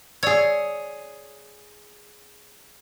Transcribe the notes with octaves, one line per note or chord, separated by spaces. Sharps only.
G#4 C#5 D5 E6 G#6